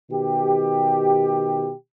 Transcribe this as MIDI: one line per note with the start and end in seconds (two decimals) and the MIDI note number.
0.11 1.71 47
0.11 1.71 51
0.11 1.71 67